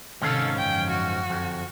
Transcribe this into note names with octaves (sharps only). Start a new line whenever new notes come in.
G#2 C3 D#3 C#4 A4 F5
F#2 D3 F3 G5
F#4
F2